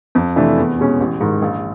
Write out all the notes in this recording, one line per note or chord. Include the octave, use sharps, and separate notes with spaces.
F2
C3 E3 A3 D4
E2
B2 G#3 C#4
A1
G#2 D#3
A#1